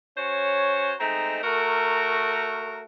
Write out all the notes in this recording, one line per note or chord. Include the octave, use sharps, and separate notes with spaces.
C#4 F#4 C5 C#5
G#3 A3 C4 D#4 A#5
A3 F#4 A#4